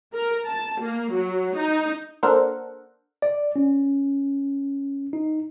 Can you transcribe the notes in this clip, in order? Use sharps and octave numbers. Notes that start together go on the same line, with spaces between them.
A#4
A5
A#3
F#3
D#4
A#3 D4 A4 A#4 C5 F#5
D5
C#4
D#4